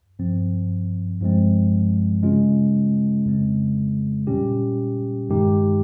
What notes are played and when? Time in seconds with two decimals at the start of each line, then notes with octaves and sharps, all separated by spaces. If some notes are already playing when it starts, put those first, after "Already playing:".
0.19 G2 F3 C4
1.21 G2 F3 G#3 C4
2.23 C#3 G#3 C#4 F4
3.25 F2 C#3 G#3 C4
4.27 A#2 G3 C#4 G4
5.29 G2 D#3 G#3 D#4 G4